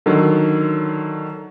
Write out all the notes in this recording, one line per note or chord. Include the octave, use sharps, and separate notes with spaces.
D3 D#3 F#3